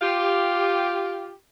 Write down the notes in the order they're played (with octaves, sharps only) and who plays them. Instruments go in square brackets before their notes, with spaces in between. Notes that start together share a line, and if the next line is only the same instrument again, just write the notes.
[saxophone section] F4 G4